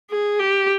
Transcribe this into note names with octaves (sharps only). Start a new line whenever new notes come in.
G#4
G4